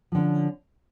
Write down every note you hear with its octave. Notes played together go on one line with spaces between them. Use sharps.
D3 F3 C#4